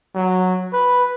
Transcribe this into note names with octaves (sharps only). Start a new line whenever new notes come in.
F#3
B4